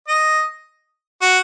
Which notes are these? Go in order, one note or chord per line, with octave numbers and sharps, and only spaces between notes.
D#5
F#4